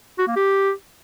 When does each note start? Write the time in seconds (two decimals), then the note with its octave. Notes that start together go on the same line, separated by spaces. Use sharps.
0.19 F#4
0.28 A#3
0.36 G4